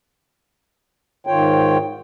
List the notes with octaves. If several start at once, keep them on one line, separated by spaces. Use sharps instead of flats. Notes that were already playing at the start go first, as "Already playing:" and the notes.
G#2 D#3 F4 C#5 G5